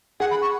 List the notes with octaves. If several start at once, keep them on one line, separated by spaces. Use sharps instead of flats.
G#4 F#5
B5
C#6